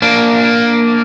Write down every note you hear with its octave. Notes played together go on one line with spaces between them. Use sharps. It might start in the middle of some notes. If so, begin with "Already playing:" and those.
A#3 D4